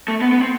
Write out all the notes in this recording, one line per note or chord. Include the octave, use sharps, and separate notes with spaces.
A3
B3
B3
C4